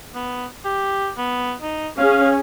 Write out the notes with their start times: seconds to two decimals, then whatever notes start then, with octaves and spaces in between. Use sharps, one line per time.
0.15 B3
0.65 G4
1.18 B3
1.62 D#4
1.98 C#4 G#4 F5